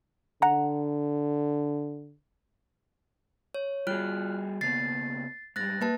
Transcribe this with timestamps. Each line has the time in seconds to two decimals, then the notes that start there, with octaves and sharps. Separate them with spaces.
0.42 D3 F#5 A#5
3.54 C#5
3.87 G3 F4 F#4 G#4 F6 F#6
4.61 C#3 A#3 B3 A6 C7
5.56 G#2 G3 F#6 A6 A#6
5.81 A#3 B4 A5